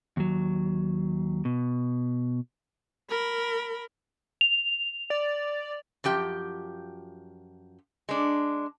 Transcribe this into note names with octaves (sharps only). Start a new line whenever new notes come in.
D#2 F#3
B2
A#4 B5
F7
D5
F#2 F3 G4 G5
G#3 D4